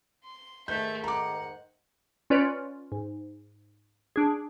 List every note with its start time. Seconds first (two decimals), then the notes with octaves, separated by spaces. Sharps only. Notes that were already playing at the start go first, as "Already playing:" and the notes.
0.23 C6
0.68 G#2 D#3 A3 E5 G6
1.04 F#5 A#5 D6
2.30 C#4 F4 B4 C#5 D5
2.92 G#2
4.16 D4 G#4